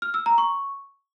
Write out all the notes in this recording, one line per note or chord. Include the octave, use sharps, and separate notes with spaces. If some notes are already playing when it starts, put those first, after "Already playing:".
F6
E6
A#5
C#6